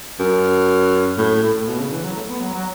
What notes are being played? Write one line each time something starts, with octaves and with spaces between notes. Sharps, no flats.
F#2
A2
A2
B2
C#3
E3
F#3
A3
B3
F#3
F#3